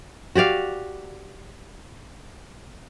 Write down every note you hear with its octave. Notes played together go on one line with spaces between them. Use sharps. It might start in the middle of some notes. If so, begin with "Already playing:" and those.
F#4 G4 D5 F5